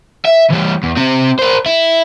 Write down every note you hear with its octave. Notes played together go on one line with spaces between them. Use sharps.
E5
E3 G3
E2
C4 G4
A#4 C5
E4